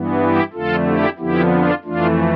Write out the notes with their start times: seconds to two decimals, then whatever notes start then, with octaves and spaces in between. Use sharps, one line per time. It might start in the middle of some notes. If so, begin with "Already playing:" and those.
Already playing: G2 E3 B3
0.21 E4 G4
0.53 F2 D3 A3 F4 A4
0.86 E4 G4
1.18 F2 D3 F3 B3 E4 G4
1.51 D4 F4
1.84 F2 E3 A3 D4 F4